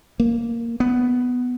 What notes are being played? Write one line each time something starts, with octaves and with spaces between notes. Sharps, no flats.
A#3
B3